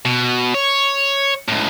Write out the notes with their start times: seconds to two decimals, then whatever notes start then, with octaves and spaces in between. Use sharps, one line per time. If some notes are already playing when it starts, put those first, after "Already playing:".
0.05 B2
0.54 C#5
1.49 C#2 A2